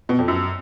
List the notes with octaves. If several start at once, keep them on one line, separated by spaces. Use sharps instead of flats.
B2
F2
F#2